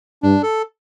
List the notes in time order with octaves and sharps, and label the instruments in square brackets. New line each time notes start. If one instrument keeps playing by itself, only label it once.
[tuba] G2 [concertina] D4
[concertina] A4